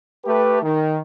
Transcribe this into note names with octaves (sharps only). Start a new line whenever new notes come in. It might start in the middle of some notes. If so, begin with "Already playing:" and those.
A3 G4 B4
D#3